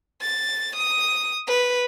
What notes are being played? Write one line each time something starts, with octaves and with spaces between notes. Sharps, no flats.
A6
D#6
B4